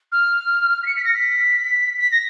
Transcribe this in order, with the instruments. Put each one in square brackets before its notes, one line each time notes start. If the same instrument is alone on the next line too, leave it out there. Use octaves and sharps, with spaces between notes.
[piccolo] F6
B6
C#7
B6
A#6
B6
B6
A#6